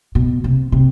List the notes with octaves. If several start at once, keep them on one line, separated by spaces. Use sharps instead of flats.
B2
C3
C3